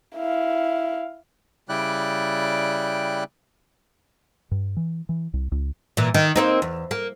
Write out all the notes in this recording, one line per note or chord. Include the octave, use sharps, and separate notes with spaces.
E4 F5
C#3 G3 E4 D5 G5 F#6
G2
E3
E3
C2
C#2
A#2 E3
D#3
A#3 C4 D#4
E2
A#3